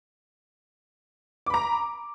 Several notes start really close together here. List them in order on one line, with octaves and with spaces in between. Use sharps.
D6 B5 A#5